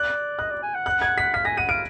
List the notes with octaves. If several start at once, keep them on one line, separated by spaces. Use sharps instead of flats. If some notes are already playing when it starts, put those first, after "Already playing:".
Already playing: D5 F#6
D#5 F#6
D5
G#5
F#5
F#6
G#6
B6
F5 B6
G#5 A#6
F#5 D#7
F5 D7